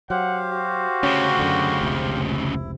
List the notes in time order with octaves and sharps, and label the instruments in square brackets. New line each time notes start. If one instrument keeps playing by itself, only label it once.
[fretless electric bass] F#3 [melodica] G4 C5 F5 [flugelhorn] F#5
[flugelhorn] F#4
[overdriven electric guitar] D2 C#3 [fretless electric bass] C#4
[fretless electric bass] F#2 D3
F1 C#2 C3
[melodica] E4